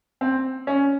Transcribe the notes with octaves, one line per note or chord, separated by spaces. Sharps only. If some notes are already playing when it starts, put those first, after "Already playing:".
C4
C#4